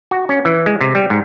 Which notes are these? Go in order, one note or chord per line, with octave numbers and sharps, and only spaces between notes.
F#4
C#4
E3
G#3
C3
G3
G#2